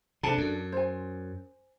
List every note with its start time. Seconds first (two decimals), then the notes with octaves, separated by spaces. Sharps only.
0.23 C3 D4 A4 A5
0.38 F#2
0.72 C5 G#5